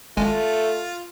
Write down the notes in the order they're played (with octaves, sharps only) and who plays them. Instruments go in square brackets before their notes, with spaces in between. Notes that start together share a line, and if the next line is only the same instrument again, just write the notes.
[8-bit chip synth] G#1 G#3 G#5 [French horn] A3 [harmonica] F4